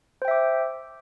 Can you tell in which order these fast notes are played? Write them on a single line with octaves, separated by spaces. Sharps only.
C5 G5 E5 D6